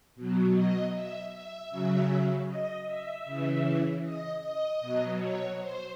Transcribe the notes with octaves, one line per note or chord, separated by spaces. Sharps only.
B2 F#3
D#5
E5
E5
C#3 F#3
D#5
E5
C#3 E3
D#5
D#5
B2 F#3
C#5
C5